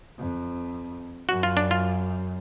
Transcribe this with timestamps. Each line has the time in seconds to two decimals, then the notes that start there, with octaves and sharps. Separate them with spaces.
0.19 F2
1.29 F#2 F#4
1.43 F4
1.57 D4
1.71 F4